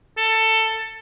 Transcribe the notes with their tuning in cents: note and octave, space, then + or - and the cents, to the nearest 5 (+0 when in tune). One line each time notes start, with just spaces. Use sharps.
A4 +15